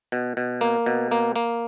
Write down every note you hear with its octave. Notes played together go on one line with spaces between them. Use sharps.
B2
B2
A#3
B2
A#3
A#3